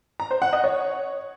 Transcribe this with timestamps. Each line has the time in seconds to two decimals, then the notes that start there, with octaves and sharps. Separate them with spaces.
0.20 A#5
0.31 C5
0.42 F#5
0.53 D#5
0.64 C#5